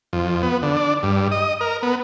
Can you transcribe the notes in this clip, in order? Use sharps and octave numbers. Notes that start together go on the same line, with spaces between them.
F2
B3
D3
D4
G2
D#5
A#4
B3